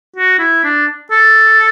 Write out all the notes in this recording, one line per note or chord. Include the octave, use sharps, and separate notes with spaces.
F#4
E4
D4
A4